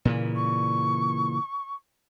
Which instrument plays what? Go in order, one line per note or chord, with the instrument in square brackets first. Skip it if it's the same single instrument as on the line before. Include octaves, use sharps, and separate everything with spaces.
[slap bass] A#2 C#3 E3
[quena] C#6